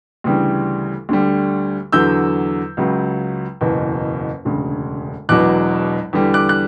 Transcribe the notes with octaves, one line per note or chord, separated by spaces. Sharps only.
D2 C#3 E3 G3
D2 D3 G3
E2 D3 F#3 E6 G6
C#2 C#3 F#3
F#1 E2 B2
E1 D2 C#3
E1 E2 B2 F#3 D6 F#6
E2 D3 G3
D6 F#6
F#6